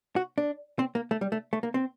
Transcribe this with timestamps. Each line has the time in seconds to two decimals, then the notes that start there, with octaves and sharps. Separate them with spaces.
0.16 F#4
0.38 D4
0.79 C4
0.95 A#3
1.11 A3
1.21 G3
1.32 A3
1.53 A3
1.63 A#3
1.74 C4